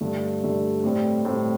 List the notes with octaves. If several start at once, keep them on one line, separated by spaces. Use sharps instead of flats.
G2 D3 A3 D4
G2 D3 A3 D4
A2 G3 C4
A2 G3 C4